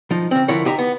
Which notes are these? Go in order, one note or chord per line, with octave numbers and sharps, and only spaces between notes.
F3 D#4
C#3 C4
D3 F3 E4 A#4 C#5
D#4 G4 E5 A#5
B3